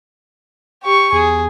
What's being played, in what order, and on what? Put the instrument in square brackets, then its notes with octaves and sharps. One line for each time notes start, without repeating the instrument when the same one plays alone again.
[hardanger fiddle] G4 C#6
[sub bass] E2 [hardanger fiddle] G#4